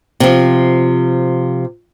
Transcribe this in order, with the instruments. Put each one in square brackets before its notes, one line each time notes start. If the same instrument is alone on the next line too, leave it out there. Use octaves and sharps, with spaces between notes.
[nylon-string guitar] C3 F3